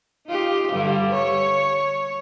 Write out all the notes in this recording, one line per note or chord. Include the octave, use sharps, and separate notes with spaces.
D#4 F4 G4
G2 D3 G3
C#5